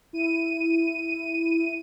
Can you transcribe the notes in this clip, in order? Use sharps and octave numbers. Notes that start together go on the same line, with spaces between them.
E4 D#7